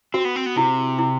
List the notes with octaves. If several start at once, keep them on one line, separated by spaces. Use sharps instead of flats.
C4 F#4
B3
C4
B3
C3 E4
E4